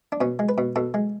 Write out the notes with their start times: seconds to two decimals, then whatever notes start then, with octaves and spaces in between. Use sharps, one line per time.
0.12 D4
0.21 B2 C#4
0.39 G#3
0.49 B4
0.58 B2
0.76 B2 A4
0.94 G#3